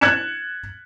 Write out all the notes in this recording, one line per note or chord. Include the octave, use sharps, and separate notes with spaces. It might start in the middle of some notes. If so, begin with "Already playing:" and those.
F#6 G#6 A6 C#7 E7